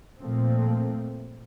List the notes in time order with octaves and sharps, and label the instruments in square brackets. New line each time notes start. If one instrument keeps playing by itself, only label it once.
[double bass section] A#2 F3 A3 C4